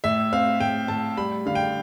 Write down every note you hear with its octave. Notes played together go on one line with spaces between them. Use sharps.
A2 E5
C4 F5
A2 G5
A2 A5
G3 B5
D3 F5
G5